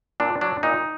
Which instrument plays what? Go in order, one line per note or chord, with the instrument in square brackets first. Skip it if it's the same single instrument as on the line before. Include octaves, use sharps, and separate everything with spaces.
[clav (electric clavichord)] A#2 D4
F#3 D4
A#2 D#4